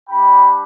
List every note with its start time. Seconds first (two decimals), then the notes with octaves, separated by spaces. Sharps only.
0.09 G3 D4 G4 G5 B5